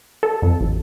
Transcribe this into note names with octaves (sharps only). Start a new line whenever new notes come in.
A4
F2
A1